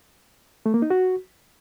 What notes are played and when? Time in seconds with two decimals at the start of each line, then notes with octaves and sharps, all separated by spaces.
0.66 A3
0.74 A#3
0.82 D#4
0.90 F#4